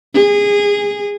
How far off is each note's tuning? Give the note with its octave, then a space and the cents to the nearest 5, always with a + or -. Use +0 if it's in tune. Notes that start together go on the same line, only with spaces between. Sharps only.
G#4 -20